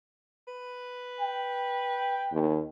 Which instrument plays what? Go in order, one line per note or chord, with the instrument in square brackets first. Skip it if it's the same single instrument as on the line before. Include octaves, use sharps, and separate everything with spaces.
[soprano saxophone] B4
[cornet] G5
[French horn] D#2